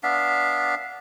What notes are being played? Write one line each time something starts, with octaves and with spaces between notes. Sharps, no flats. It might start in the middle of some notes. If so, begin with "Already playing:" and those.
B3 D4 E5 F5